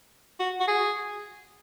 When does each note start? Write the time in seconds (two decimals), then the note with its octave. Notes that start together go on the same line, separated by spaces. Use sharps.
0.40 F#4
0.60 F#4
0.68 G#4